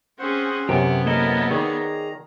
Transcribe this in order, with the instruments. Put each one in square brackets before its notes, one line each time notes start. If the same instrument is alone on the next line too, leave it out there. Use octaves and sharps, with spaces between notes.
[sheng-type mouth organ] C4 C5 F#5 [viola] C#4 G#4
[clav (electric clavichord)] F#2 C3 [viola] B3 [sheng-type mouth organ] C#4 [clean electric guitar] G4
[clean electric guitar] A#3 A4 D#5 [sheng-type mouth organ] E4 A#4
[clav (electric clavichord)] D#3 [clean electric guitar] G#4 C#5 D5 [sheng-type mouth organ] A#5